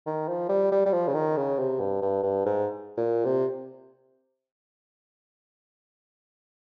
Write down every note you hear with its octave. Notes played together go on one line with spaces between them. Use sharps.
D#3
F3
G3
G3
G3
F3
C#3
D#3
C#3
C3
G2
G2
G2
G#2
A#2
C3